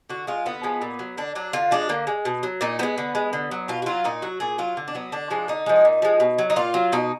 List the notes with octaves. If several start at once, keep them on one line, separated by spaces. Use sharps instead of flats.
D3 F#4
G#3 F4
D3 B3
F3 G#3
A#2
F#3
D3 D4
F#3 D4
D3 F4
F3 G#3 D4
D3 A#3
G#3
B2
F#3
A#2 D#4
F3 G#3 B3
D3
G#3
D3
F#3
B2 F4
F#4
F#3 F4
A#2 D#4
F#3 F#4
A#2 G#4
F#3 F4
D3
D4
F#3 B3
D3 D4
F3 G#3
D3 D#4
F3 G#3
A#2
F3 G#3
B2
F#3
D#4
A#2 F4
F#3
B2 D#4